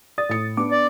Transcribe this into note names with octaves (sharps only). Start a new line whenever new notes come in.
D5 D#6 A6
A2 C#7
B3 D4 D6
D5